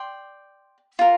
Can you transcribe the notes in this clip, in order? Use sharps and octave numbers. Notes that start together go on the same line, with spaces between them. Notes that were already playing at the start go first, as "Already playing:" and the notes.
Already playing: D5 G5 C6
F4 A#4